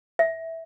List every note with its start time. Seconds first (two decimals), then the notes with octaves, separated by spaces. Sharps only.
0.19 E5